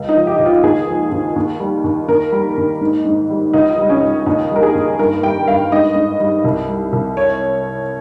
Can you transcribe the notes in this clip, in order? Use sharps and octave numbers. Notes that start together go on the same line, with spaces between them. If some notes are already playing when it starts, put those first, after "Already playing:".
Already playing: C#2
D#4
F3
G4
C#2
F4
D#2 G#4
F3
D#2
D#2
G3
D#2
D#2 A#4
G3
D#2
G#2
G#2
G3
C#2 D#4
G3
C#4
C#2
D#2 D#4
G3 A#4
G#4
D#2
G2 A#4
G3 G5
G2 F5
G#2 D#5
G#2
G3
C2
G3
C2
C#5